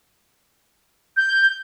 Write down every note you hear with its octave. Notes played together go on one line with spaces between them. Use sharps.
G6